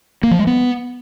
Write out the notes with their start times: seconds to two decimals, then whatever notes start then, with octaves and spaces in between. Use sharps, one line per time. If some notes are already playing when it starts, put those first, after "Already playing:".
0.23 A#3
0.31 F3
0.39 G#3
0.47 B3